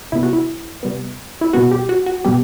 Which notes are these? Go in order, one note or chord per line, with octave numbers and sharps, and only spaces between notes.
C3 G3 B3 E4
F#4
E4
C3 G3 B3
E4
B2 G3 B3 F#4
G4
F#4
F#4
B2 G3 B3 G4